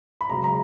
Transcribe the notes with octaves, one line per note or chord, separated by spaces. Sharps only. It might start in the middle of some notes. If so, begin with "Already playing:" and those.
B5
C#2 C#3 F#3 A#5
A#5